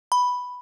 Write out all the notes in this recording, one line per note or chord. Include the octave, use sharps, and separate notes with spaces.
B5